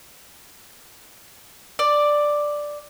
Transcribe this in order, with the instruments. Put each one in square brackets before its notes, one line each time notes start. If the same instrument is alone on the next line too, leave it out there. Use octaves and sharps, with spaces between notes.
[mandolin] D5